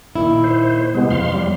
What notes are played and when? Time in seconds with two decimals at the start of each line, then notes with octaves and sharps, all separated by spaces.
0.16 A#2 D#3 E4
0.44 C5
0.94 C3 G#3 B3
1.10 F2 F5 C6
1.33 G3